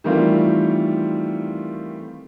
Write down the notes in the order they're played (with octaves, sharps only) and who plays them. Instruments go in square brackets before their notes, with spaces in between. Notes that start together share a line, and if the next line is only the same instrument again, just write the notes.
[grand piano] D#3 E3 G3 A3 C4 F4